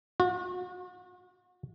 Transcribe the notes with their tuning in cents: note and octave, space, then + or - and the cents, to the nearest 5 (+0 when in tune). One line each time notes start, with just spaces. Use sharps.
F#4 -40